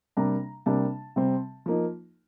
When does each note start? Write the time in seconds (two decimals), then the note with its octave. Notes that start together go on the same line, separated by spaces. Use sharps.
0.17 C3 G3 A#3 D4 A#5
0.66 C3 G3 A#3 D4 A5
1.16 C3 G3 C4
1.66 F3 A#3 D#4